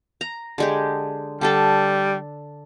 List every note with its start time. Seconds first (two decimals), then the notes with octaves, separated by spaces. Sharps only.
0.21 A#5
0.58 D3 G#3 G4
1.41 D3 G3 D4 A4